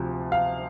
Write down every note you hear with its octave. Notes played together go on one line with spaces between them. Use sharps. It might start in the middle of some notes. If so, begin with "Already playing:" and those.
Already playing: D2 C3 F3
F5